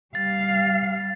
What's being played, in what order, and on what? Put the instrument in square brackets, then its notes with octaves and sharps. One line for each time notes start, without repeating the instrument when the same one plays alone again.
[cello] G3 F5 [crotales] A6